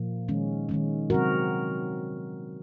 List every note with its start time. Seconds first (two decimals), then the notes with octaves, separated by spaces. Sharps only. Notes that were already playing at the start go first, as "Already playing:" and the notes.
Already playing: A#2 F3 A#3
0.28 D#3 G#3 C#4
0.69 D#3 G#3 C#4
1.10 C3 F#3 C4 F#4 A#4